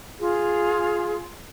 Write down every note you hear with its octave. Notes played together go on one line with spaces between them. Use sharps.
F4 G#4